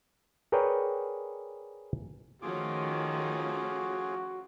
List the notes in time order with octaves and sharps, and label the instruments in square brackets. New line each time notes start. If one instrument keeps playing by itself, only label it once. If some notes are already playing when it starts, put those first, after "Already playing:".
[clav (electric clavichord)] G#4 A#4 B4 C#5 D5 G5
[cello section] D#3 [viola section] F3 A3 C#4 [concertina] F4 G#4 D6 [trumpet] F#4